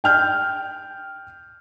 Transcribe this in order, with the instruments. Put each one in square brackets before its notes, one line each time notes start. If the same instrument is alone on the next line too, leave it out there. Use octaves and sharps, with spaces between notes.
[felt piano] G5 F6 G6